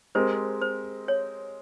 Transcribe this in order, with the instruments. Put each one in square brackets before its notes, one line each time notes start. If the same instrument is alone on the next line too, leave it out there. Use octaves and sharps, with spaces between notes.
[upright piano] G#3 C4 G4 A#4 [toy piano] C5
[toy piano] C5
C#5